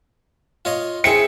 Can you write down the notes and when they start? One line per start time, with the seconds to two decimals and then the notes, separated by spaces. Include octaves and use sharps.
0.65 F4 C#5 D#5
1.04 C4 E4 G#4 E5 C#7